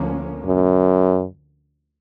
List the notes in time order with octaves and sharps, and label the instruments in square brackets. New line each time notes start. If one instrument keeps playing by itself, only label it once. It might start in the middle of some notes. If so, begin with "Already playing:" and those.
Already playing: [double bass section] D2 D3 F3 A#3 C#4
[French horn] F#2